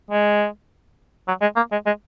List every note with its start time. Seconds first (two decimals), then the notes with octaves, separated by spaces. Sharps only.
0.11 G#3
1.28 F#3
1.42 G#3
1.56 A#3
1.72 G#3
1.86 G#3